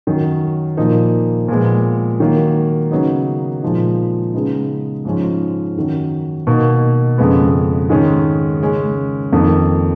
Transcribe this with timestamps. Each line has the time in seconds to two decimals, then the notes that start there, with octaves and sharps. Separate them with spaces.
0.07 F#2 D#3 F#3 C#4
0.77 A#2 F3 A#3 D#4
1.48 A#2 F3 G#3 B3
2.20 D#3 F#3 A#3
2.91 C#3 F#3 B3 D#4
3.62 A#2 F3 G#3 D#4
4.34 C#3 G#3 B3 D#4
5.05 G#2 F3 G#3 C#4
5.76 F#2 D#3 F#3
6.47 B2 A#3 D#4
7.18 F2 C#3 G#3 B3
7.90 G#2 D#3 G#3 C#4
8.61 C#3 G#3 C#4
9.33 F2 D#3 A#3 D#4